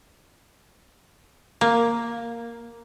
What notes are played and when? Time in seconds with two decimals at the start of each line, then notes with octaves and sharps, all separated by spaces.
1.61 A#3